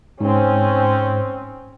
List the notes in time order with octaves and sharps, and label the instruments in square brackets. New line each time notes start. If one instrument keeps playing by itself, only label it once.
[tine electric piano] G#2 [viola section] C4 C#4